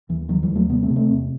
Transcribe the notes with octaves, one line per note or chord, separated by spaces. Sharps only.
D#2 E3
D#2 D#3 F#3
E3 G3
D#2
F#3 A3
C3 G3 B3
A3 C4
C3
A3 C4
E2